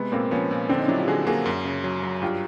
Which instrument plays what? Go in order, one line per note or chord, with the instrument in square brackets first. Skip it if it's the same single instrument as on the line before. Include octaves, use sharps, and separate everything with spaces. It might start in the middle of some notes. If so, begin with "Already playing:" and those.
Already playing: [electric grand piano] C3 G#3 [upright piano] B3
[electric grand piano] A#2 [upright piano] A#3 C4
[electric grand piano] F3 [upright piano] B3 C#4
[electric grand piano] A#2
[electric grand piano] D3 [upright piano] C4 D4
[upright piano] C#4 D#4
[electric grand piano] F#3 [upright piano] D4 E4
[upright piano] F4 G4
[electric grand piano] D3 [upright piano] F#4 G#4
[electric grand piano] A#3 [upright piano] F#4 G#4
[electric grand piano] F#2
C#3
F#3
F#3
[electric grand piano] G2 [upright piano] F4 G4